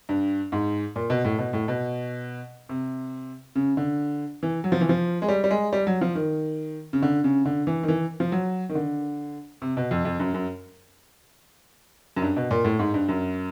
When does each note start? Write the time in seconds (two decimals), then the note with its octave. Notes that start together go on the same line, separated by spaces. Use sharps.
0.09 G2
0.52 G#2
0.96 A#2
1.10 B2
1.25 A2
1.39 B2
1.53 A2
1.68 B2
2.69 C3
3.55 C#3
3.77 D3
4.43 E3
4.64 F#3
4.72 F3
4.81 E3
4.89 F3
5.22 G#3
5.28 G3
5.44 G3
5.51 G#3
5.73 G3
5.87 F#3
6.01 F3
6.15 D#3
6.93 C#3
7.02 D3
7.24 C#3
7.45 D3
7.67 E3
7.83 D#3
7.88 E3
8.20 F3
8.32 F#3
8.69 D#3
8.75 D3
9.62 C3
9.77 B2
9.91 F2
10.05 F2
10.20 F#2
10.34 F#2
12.16 F#2
12.22 G2
12.36 B2
12.51 A#2
12.65 A2
12.79 G#2
12.94 G2
13.09 F#2